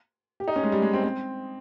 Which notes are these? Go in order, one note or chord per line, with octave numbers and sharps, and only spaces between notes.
G4
D#4
C#4
G#3
G3
G#3
C4
C4